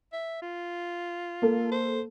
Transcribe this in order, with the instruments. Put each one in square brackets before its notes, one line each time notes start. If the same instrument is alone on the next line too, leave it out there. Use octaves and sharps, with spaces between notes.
[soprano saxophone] E5
F4
[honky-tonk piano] A#3 A4
[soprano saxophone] C5